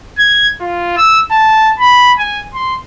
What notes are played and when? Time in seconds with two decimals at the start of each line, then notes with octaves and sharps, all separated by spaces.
0.19 G#6
0.61 F4
0.97 E6
1.31 A5
1.79 B5
2.18 G#5
2.54 C6